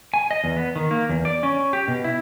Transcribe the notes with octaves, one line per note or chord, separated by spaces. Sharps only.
G#5
D#5
E2
B3
D#3
A#3
E2
D5
C#4
G4
B2
E4